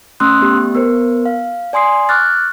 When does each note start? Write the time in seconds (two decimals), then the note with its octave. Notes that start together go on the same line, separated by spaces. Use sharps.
0.20 A3 C#4 C6 D#6 E6 F#6
0.41 A3 B3 G4
0.75 B3 A#4 C5
1.25 F5
1.73 D5 G#5 C6 D#6 C7
2.09 C#6 D6 F6 F#6 A6